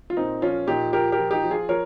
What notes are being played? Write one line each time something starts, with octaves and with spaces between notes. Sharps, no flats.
F4
A#2 C4 D#4
F3 C#4 F4
A#2 D#4 G4
F3 G4 A#4
G4 A#4
F3
D#4 G4
F3
F4 G#4
F3 A#4 C#5